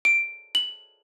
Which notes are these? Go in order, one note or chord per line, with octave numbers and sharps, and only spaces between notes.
D7
F#7